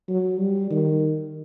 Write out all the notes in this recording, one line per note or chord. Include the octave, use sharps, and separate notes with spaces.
F#3
G3
D#3